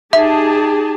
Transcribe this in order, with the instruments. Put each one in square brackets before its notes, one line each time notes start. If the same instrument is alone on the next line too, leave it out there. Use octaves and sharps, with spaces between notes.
[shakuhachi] D#4 [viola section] G4 G#4 A5 [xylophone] E5